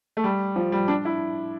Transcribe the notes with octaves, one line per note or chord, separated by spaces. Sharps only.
A3
G3
F3
G3
D4
E4